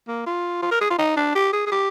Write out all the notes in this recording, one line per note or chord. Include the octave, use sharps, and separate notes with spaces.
A#3
F4
F4
A#4
G#4
F4
D#4
D4
G4
G#4
G#4
G4